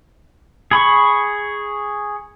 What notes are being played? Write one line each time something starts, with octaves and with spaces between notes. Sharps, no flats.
G#4 B5 C#6